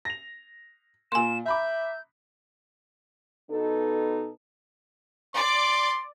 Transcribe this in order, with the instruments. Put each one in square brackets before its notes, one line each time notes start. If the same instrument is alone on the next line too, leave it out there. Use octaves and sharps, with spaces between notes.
[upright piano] A#6 F7
[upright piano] A#2 A#3 [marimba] G#5 C6 [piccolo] E7
[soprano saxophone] E5 [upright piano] A#5 B5 D6 [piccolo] G6
[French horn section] B2 B3 D#4 A4
[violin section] D5 D6 [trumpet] C6